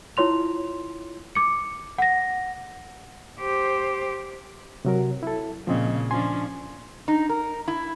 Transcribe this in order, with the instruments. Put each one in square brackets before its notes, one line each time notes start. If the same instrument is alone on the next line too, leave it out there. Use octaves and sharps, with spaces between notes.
[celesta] E4 F4 C#5 C6 F7
D6 C#7
F#5 A#6
[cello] G4 C5
[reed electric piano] C3 F#3 A#4
E4 A4
[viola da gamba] A#2 C#3 [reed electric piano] F3 C4 D#5
[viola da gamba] F3 C#4 D4 [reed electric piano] G#5 C6
[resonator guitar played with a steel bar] D#4
A#4
E4